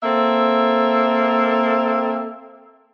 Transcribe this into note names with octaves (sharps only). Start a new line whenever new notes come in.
A#3 C4 A4 E5